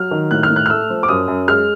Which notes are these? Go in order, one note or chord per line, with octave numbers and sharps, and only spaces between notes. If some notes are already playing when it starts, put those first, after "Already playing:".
Already playing: F#3 F6
D#3
A2 F#6
F6
A2
F#6
F6
A3 E6
F3
D6
F#2 D#6
F#2
G#3 F6